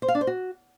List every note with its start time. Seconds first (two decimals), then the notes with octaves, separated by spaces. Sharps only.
0.02 C5
0.08 F5
0.15 D4
0.21 C5
0.27 F#4